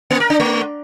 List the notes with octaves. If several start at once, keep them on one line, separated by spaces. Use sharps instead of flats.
A#3
A#4
D4
A3